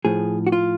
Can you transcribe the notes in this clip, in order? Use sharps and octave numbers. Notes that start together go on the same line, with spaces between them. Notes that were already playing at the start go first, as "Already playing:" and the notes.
A2 F3 G#4
F#4
F4